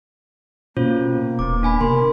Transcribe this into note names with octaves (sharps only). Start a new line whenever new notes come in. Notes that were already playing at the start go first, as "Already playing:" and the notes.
B2 A#3 C#4 F4 C5
D#1 B3 D6
D4 G#5 B5
C3 A#4 C6